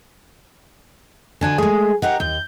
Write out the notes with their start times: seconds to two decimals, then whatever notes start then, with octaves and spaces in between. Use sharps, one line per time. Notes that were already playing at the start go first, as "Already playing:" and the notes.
1.41 D3 D4 F#4 G#5
1.58 G#3 A3 G#4
2.02 D#4 G4 A#4 F#5
2.20 D#2 G6